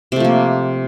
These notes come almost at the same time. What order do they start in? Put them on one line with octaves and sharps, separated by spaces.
C3 A3 F3 A#3